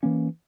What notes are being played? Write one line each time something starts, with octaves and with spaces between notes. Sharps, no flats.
E3 A#3 C#4